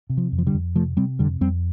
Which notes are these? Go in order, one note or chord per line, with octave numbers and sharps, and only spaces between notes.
C3
F3
F2
F3
D3 G3
F2
C3 F3 A3
C3 G3 C4
F2 D3 G3
F2 G3 C4